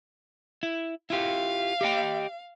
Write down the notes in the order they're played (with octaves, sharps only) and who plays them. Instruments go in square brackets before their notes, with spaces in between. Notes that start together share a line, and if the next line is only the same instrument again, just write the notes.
[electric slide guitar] E4
[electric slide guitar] E4 F4 G4 [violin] F5
[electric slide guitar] G4 D#5 G5